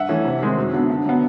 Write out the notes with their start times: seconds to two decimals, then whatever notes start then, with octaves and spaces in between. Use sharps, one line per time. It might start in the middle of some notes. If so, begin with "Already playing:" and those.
Already playing: G2 E5 F#5
0.09 E3 A3 C#4
0.25 C3
0.41 D#3 G#3 C4
0.57 F#2
0.73 D3 F#3 B3
0.90 D3
1.05 F#3 B3